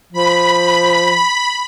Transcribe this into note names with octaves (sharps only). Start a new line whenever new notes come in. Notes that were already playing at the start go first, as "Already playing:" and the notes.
F3 B5